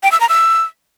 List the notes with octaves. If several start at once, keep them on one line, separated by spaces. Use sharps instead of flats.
G5
E6
A#5
E6